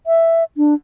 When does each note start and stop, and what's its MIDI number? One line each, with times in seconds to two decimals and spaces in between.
0.07 0.44 76
0.57 0.74 62